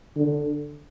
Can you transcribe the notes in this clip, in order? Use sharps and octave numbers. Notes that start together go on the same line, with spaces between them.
D3